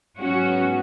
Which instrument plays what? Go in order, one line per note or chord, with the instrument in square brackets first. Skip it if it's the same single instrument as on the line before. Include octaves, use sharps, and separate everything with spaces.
[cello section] G#2 F#3 B3 C#4 F#4